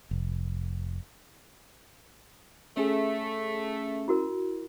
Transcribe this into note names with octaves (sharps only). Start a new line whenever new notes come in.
F1
A3 C#4 G#4
E4 F#4 A#4